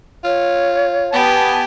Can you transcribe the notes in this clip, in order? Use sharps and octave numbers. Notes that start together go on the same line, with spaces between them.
F4 C#5
B3 G4 G#5 A5